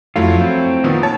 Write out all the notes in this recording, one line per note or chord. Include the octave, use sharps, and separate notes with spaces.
F2 F#3 A3 E4 F4
C4
A#2 D#3 B3
C#5 A5